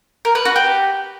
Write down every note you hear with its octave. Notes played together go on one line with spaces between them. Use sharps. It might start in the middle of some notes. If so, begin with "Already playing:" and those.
A#4
B4
F#4
G4